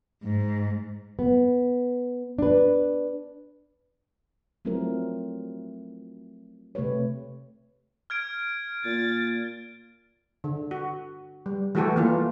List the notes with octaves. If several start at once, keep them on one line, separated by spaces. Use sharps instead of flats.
G#2
B3
D4 B4
F3 F#3 A3 C4 E4 A#4
C3 A3 G4 B4 C#5
F6 G#6 D7
A#2 A6
D3
F#4
G3
E3 A3 F#4 G4 A4
E3 A#3 F4